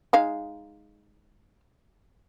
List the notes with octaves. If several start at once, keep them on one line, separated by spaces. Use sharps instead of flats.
G#3 D#4 F5